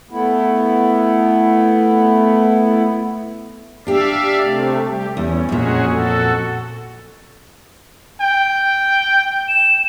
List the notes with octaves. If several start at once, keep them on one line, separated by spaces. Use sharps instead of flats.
A3 B3 E4
D4 G4 D5 E5 F5
C3 A3
G3 G4
E2 C#4
F2 A#2 C#4 F#4 G#4
F#4 A4
G5
E7